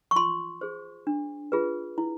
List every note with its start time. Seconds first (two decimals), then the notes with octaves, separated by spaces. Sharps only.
0.11 C#6
0.16 F4 C6
0.61 G#4 C5
1.07 D4
1.52 F4 G#4 B4
1.98 E4